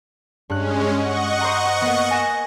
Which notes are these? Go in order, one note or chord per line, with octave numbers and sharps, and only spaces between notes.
G2 G#3 C#4 F#6
D#5 F#5 C#6
C5 A#5
A#3 B3
G#5 A#6 E7